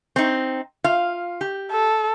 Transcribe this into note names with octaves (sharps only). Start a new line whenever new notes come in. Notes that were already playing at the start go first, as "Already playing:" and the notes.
C4 D#4
F4 F5
G4
A4